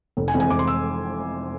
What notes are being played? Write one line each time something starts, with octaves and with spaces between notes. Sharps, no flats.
F1
G#5
F2 E3 G#3 C4
G#5
F1 D6
C6
E6